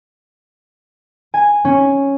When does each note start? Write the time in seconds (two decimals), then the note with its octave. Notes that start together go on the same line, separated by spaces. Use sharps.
1.34 G#5
1.65 C#4